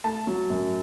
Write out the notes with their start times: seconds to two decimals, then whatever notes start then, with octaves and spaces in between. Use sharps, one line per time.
0.04 A3 A5
0.27 F#3
0.50 F#2